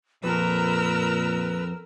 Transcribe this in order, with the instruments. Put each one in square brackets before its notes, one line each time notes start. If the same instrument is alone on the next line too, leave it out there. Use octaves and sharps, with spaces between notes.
[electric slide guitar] F2 [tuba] A#2 [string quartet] A#4 A#5 E6 [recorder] B4